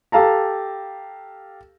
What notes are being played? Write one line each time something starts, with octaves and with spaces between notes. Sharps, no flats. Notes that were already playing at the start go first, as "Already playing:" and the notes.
G4 A4 F5 A5 A#5